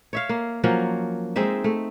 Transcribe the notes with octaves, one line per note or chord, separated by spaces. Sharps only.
C#5 E5 F5
A#3
F3 F#3 A#3 C#4
G#3 C4 D#4 E5
A3